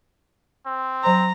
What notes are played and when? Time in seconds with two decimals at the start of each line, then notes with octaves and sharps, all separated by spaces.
0.66 C4
1.03 F#3 C5 A#5 C6